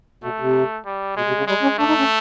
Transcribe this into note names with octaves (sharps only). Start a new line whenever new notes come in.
B2 A3
C3
G3
B2 G#3
C3
C#3
G3 G#3
C#4
A3 D4
D#4
C#4